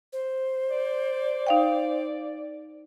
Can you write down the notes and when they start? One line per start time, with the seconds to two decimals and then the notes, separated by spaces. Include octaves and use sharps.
0.13 C5
0.71 D5
1.47 D#4 F5 G5